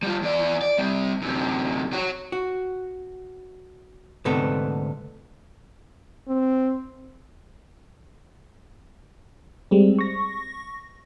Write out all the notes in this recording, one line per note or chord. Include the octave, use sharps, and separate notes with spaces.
G3 F4
E2 D5
D5
G3 C4
F#2 C3
F#4 C#5
F#4
D2 G#2 C3 B3 A4
C4
G3 G#3 C4
C#6 A#6